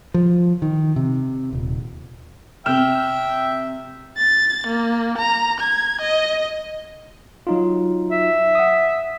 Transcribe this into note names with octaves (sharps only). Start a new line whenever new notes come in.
F3
D#3
C3
D#1
C3 E5 G5 F6 E7
A6
A#3
A#5
G#6
D#5
F#3 D#4 F4
E5
F#5 D#6